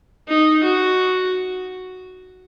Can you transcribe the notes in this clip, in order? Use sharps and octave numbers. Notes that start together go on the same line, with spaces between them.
D#4
F#4